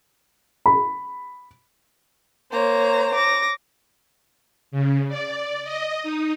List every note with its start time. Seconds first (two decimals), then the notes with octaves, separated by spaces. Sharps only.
0.66 B5
2.52 A#3 C5 C#5 A#5
3.14 D6 A#6
4.71 C#3
5.08 D5
5.64 D#5
6.03 D#4